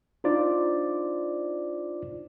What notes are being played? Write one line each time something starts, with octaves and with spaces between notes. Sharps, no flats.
D4 D#4 F4 C5 D5